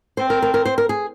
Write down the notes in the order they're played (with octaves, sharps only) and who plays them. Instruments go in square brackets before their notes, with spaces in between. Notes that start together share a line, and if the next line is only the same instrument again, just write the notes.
[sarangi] C4 [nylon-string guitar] C5
[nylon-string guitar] A#4
A#4
A#4
C5
A#4
G#4